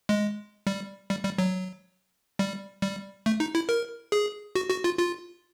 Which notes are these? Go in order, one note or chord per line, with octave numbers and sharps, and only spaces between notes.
G#3
G3
G3
G3
F#3
G3
G3
A3
D#4
E4
A#4
G#4
F#4
F#4
F4
F4